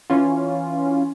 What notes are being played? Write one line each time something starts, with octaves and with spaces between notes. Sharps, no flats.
E3 C#4 F4